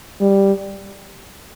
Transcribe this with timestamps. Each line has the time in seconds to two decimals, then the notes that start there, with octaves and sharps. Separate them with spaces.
0.21 G3